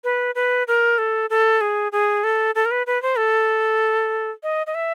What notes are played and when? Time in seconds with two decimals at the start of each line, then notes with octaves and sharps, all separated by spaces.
0.04 B4
0.35 B4
0.68 A#4
0.98 A4
1.30 A4
1.61 G#4
1.92 G#4
2.24 A4
2.55 A4
2.65 A#4
2.71 B4
2.87 B4
3.02 C5
3.18 A4
4.43 D#5
4.67 D#5
4.75 E5